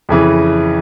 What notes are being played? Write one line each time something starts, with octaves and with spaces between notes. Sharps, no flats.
F2 C#3 E3